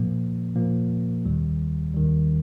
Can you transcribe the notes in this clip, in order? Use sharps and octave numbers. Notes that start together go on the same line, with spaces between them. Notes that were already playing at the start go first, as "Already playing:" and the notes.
Already playing: A#2 F3 A#3
A#2 F3 A#3
D#2 D#3 G3
D#2 D#3 G3